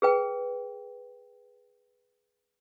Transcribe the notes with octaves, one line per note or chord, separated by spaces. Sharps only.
G#4 B4 G5